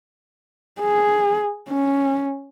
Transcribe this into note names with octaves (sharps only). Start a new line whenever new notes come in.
G#4
C#4